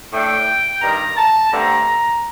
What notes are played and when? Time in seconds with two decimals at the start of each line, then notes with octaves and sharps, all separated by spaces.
0.12 A2 A3 D4 G5
0.82 G2 D#3 G3 A#5
1.17 A5
1.52 G2 D3 A3 C4 A#5